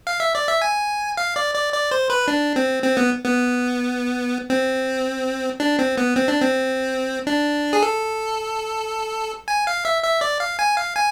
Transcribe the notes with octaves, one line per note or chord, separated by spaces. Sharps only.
F5
E5
D5
E5
G#5
F5
D5
D5
D5
C5
B4
D4
C4
C4
B3
B3
C4
D4
C4
B3
C4
D4
C4
D4
G#4
A4
G#5
F5
E5
E5
D5
F5
G#5
F5
G#5